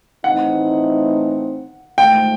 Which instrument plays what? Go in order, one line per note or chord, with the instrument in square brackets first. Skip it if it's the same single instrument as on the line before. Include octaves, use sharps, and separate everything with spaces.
[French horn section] A2 E3 A3 C4 D#4 [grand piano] F#5
[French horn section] G#2 F3 A3 [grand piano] G5